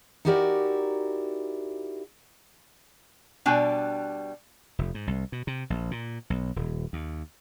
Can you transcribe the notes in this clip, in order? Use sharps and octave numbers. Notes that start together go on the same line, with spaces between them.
D#4 E4 F#4 G4 A#4 D5
B2 G3 D4 G5 G#5
F1
G#2
C2
B2
C3
A#1
A#2
B1
D#1
D#2